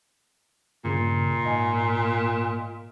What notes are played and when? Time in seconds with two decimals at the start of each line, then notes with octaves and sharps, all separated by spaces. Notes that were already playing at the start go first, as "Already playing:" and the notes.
0.84 G2 A#2 C#3
1.44 G#2 D#5 G#5